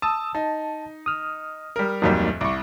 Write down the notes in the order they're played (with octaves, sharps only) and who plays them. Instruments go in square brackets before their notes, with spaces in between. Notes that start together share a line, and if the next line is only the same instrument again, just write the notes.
[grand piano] A5 [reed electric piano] D#6 E6
[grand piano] D#4 [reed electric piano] A5
[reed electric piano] D#6 F6
[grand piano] G3 A#4
[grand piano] D1 F2 G3 [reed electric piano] F#3 A#3 D#4
[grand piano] C2 [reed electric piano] C#6 D6